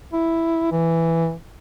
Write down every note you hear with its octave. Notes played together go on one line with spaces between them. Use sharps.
E4
E3